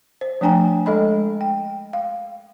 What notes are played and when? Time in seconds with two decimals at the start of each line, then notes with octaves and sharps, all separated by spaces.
0.21 C5
0.41 F3 A3 D4 G5 G#5 A#5
0.86 G#3 A4 D#5 B5
1.41 G5
1.93 F5